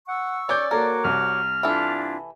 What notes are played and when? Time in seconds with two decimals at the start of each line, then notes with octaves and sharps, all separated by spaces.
0.08 F#5 C#6 E6
0.49 C#4 C#5 D5 D6 G6
0.71 A#3 F#4 A4 A#4 C#5 D6
1.04 C2 F6
1.63 E3 D4 E4 F4 A4